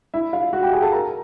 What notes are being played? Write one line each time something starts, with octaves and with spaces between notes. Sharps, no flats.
E4 E5
F4 F5
F#4 F#5
G4 G5
G#4 G#5
A4 A5
A#4 A#5